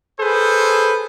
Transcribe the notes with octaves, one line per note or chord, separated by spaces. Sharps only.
G#4 A4 B4 C5